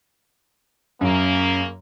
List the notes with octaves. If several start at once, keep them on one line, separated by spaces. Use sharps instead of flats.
F#2 C#3 A#3